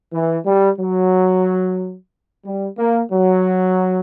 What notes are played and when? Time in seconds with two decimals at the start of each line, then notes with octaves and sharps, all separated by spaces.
0.12 E3
0.46 G3
0.79 F#3
2.45 G3
2.78 A#3
3.12 F#3